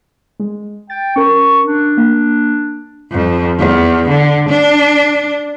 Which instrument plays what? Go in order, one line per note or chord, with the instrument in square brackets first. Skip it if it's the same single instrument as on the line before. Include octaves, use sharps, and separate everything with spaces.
[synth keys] G#3
[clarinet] G5 [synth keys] A6
[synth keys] C#4 A#4 [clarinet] C#6
[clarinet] D4
[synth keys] A#3
[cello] F2
E2
D3
D4